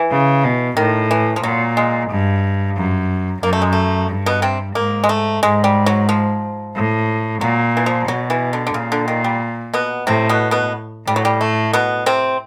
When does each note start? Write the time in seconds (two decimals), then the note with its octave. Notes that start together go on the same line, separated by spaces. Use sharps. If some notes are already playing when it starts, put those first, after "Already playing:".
Already playing: E3
0.11 C#3
0.44 B2
0.77 A2 D#3
1.11 E3
1.36 F3
1.43 A#2 F#3
1.77 G#3
2.10 G2
2.77 F#2
3.42 F#2 A#3
3.53 A3
3.62 G#3
3.73 A3
4.09 G2
4.26 B2 B3
4.42 C3 C4
4.75 G#2 A#3
5.04 G#3
5.09 A3
5.42 G#2 G#3
5.64 G3
5.86 F#3
6.09 F3
6.75 A2
7.41 A#2 F#3
7.77 E3
7.86 F3
8.08 B2 F#3
8.30 E3
8.53 D3
8.67 D3
8.74 A#2 C#3
8.92 D3
9.08 D#3
9.24 G3
9.73 B2 B3
10.07 A2 C3 C4
10.29 B2 B3
10.51 B2 B3
11.07 A2 G3
11.16 F#3
11.25 G3
11.41 A3
11.73 B2 B3
12.06 C3 C4